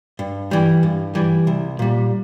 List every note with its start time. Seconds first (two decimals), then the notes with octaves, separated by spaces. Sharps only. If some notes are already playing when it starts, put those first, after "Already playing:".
0.19 G2
0.51 E3 G3
0.83 G2
1.15 E3 G3
1.47 C2
1.79 A#2 G3